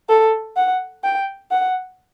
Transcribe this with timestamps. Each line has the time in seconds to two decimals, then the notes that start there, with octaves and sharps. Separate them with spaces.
0.09 A4
0.56 F#5
1.04 G5
1.51 F#5